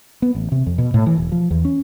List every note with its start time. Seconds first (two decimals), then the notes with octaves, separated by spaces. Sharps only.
0.22 B3
0.35 A1
0.52 C3
0.66 F2
0.78 B2
0.94 A2
1.06 E3
1.18 E1
1.32 F3
1.51 E2
1.65 C#4